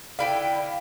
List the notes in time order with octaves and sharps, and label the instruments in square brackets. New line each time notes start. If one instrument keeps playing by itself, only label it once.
[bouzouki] D3 E4 G5 [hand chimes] F5